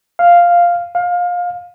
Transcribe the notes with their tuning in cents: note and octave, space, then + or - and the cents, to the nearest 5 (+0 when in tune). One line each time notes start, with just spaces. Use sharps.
F5 +0
F5 +25